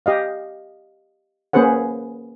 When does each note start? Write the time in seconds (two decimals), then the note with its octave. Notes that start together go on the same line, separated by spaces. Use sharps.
0.06 G4 D#5 F5
1.53 A#3 C#4 G#4 B4 C5 F#5